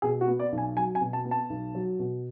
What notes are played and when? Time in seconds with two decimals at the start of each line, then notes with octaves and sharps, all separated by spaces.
0.02 B2 G#4
0.21 F#4
0.27 B3
0.40 D5
0.52 B1
0.58 G#5
0.76 F#3 G#5
0.95 G#5
1.01 B2
1.13 A5
1.25 B3
1.31 A5
1.50 B1
1.75 F#3
1.99 B2